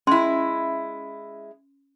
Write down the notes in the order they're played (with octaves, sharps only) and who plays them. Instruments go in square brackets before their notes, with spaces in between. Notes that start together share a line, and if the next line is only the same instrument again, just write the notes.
[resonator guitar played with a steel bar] G#3 E4 [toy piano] C#4 C6